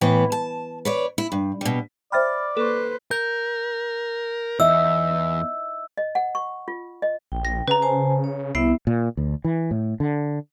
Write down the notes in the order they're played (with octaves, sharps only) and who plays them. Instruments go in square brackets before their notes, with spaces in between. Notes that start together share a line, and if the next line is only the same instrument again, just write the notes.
[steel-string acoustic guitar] A2 E3 B3
A5
B4 C#5 D5
E4
G2
B2 G3
[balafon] C5 E5 G5 [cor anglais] D5 [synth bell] B5 F6 A6
[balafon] A#3 C#6 [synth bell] A4 [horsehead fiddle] B4 C5
[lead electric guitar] A#4 [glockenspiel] G6
[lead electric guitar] E2 [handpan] D#5 E5 [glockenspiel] E6
[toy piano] D#5
F#5
C#6
F4
D#5
[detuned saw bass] A#1 [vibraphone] G5
[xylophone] A#6
[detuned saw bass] C#3 [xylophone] B4 A#5
[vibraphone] C5 G#5 A5
C#5
[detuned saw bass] C2 [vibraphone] B3 E4 E5 [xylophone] C7
[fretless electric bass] A#2
D2
E3
A2
D3